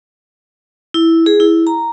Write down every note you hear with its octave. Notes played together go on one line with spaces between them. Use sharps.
E4
G#4
E4
A#5